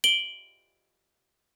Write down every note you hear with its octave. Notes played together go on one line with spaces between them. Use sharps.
D7 F#7 G7